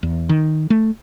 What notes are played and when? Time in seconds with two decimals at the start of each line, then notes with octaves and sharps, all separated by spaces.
0.03 E2
0.29 D#3
0.70 A3